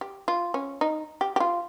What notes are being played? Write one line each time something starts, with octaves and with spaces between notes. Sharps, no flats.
G4
F4
C#4
D#4
G4
G4
F4